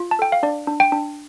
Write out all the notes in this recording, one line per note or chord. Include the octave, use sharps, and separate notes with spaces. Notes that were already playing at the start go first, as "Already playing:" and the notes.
Already playing: F4
A5
A4 G5
F5
D4 D5
D4
G5
D4